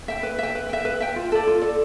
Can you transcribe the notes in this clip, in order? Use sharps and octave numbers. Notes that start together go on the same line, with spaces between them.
E5 G5
B4
E5 G5
B4
E5 G5
B4
E5 G5
F4
A4 D5
F4
A4 D5